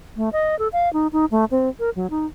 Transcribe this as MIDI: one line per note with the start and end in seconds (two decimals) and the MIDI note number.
0.17 0.29 57
0.33 0.58 75
0.59 0.68 69
0.73 0.92 77
0.93 1.07 63
1.13 1.26 63
1.31 1.45 57
1.51 1.69 60
1.79 1.90 70
1.96 2.10 54
2.10 2.26 63